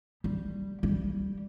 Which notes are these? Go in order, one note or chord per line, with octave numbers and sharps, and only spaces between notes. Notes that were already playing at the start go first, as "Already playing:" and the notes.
G3
G3